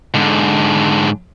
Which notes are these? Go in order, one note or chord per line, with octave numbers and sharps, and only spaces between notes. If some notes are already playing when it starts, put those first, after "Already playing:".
G#2 D3